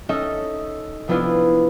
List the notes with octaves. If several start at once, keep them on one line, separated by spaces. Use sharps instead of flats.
C#4 D#4 A4 D#5 E5
C3 F3 B3 D4 E4 F4